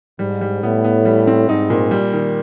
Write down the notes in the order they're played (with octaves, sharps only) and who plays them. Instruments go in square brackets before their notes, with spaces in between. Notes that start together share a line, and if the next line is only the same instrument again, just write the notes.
[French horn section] G#2 [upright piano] G3
[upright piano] G3
[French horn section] A2 [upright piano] B3
[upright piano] B3
G3
C4
[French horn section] G#2 [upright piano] D#4
[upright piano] A#2
G3
D#3